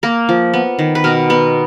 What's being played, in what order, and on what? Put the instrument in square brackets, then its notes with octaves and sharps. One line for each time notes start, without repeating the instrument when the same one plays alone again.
[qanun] A#3 A#4
F3
B3
D#3
B4
B2 A#4
B3